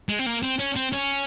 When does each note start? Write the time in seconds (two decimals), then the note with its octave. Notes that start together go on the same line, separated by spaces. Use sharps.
0.09 G#3
0.19 C4
0.26 A#3
0.43 C4
0.59 C#4
0.76 C4
0.92 C#4